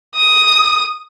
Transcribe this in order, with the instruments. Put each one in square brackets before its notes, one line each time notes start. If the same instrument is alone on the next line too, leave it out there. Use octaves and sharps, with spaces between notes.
[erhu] D#6